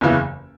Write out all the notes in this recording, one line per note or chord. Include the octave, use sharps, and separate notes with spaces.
F#1 E2 C#3 E3